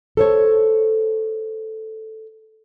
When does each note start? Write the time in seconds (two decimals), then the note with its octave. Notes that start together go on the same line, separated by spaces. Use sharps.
0.17 A4 C5 C#5